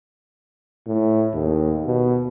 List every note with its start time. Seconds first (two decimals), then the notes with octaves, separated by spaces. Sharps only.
0.87 A2
1.34 D#2
1.86 B2